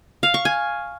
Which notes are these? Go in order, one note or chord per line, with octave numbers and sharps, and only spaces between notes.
F5
C#6
G#5